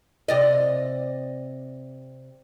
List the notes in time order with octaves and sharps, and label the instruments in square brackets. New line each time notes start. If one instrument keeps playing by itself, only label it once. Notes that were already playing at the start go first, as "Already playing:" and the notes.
[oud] C3 D5 D#5